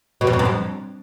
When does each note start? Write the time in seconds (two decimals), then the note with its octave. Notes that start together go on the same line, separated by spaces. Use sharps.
0.21 B2
0.27 F2
0.33 B2
0.39 F#2
0.45 F2